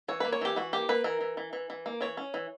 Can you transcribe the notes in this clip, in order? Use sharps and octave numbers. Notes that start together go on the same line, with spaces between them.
E3 C#5
A#3 B4
C#5
E3 G4
E3 F#4
A#3 G4
A#3 B4
E3 A#4
E3
E3
E3
E3
A#3
E3 C#5
C#4
E3